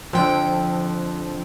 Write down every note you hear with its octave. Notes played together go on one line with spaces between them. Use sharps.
F2 D3 F3 G5